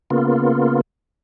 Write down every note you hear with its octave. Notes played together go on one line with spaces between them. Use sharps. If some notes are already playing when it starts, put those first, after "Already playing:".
C#3 A#3 B3 F4